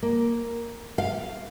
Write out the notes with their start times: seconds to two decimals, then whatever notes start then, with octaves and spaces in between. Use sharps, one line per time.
0.02 A#3
0.98 F5